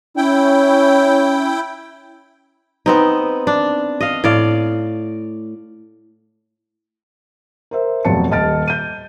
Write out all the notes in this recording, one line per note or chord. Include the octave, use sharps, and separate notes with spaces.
C#4 E4 G5
B3 C4 D#4
D4
D#5 F5
A2 D5 F5
A#4 C5 E5
F1 F2 B2 F#3 A5 C#7
D#1 D#5 A5 F6 A6 D7
G6 D#7